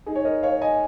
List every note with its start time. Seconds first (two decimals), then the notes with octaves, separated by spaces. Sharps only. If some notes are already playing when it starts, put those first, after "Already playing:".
0.06 D#4 G#4
0.16 C#5
0.25 A#4 D#5
0.43 C#5 F5
0.62 D#5 G#5